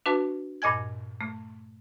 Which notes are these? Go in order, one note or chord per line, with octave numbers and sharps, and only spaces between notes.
D4 F#4 B4 A5
G2 A#2 D#5 G#5 G#6
A3